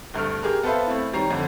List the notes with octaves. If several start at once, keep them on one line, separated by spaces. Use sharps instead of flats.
D2 G2 A3 F6
G4 G#4 A#4
B3 A4 B4 C5 E5 F5
A3 C4 E4
D#3 G3 C#5 A#5 C7
F2 D3